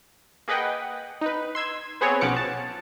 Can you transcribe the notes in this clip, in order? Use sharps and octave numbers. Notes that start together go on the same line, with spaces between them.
A#3 G#4 B4 D#5 F#5 G5
D#4 B4
C6 E6 G#6
B3 C4 G#4 B4 C#5
B1 F3 C#4 F#5 D6 C#7
A5